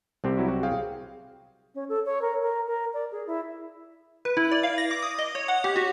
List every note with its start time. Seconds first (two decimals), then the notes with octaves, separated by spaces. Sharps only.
0.24 C2 C4 G4
0.37 F#3 E4 F#4
0.48 F#4
0.63 G#4 F5 G5
1.75 C#4
1.89 A4
2.06 C#5
2.22 A#4
2.42 A#4
2.67 A#4
2.94 D5
3.12 G#4
3.27 E4
4.25 B4
4.37 E4
4.52 D5
4.63 F5
4.78 A#6
4.91 D6
5.02 D#6
5.19 D#5
5.35 C#5
5.48 F#5
5.64 G4
5.76 F#4